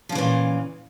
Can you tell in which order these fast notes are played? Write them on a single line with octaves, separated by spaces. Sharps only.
F3 C#3 E3 A#2